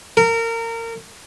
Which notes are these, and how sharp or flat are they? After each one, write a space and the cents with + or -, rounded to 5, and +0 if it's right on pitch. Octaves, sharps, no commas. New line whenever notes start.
A#4 -25